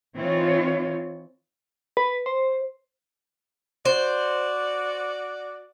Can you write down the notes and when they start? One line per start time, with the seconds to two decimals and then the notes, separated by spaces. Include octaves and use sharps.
0.17 E3 C4 D#4 F4 C#5
1.97 B4
2.26 C5
3.85 F#4 C5 D5